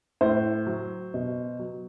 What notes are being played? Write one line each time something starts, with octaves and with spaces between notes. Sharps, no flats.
A2 C5
F#3
B2
F#3